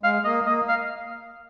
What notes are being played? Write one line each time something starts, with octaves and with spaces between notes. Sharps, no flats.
G#3 F5
A#3 D#5
A#3 D#5
F5